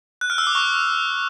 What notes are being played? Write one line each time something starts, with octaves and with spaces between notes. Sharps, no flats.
F#6
F6
E6
D6
C#6